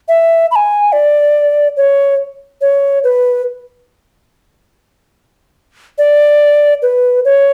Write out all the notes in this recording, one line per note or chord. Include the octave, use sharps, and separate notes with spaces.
E5
B5
G#5
D5
C#5
C#5
B4
D5
B4
C#5